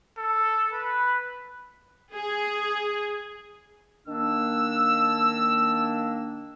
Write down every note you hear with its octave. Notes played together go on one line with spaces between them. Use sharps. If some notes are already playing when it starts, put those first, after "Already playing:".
A4
B4
G#4
D#3 A#3 D4 E6